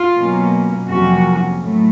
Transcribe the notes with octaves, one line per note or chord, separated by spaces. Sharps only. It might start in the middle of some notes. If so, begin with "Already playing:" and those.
Already playing: F4
B2 F#3 A#3 C#4
F2 C3 F3 F#3 A#3 C#4 F#4
A2 F#3 A3